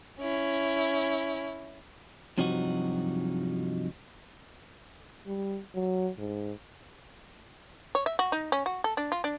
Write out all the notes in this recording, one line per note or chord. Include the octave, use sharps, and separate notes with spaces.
C#4 E4
G2 C3 F3 F#3 D#4 F#4
G3
F#3
G#2
C#5
E5
F#4
D#4
C#4
F#4
A4
D4
F4
D4